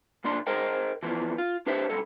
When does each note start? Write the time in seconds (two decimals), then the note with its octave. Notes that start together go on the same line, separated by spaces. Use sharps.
0.24 B1 A#2 D4 C6
0.47 G#4 A#4 C5 D#5 G5
1.03 E3 F3 B3
1.38 F4
1.66 D4 G4 B4 C5 E5
1.89 B1 G2 A4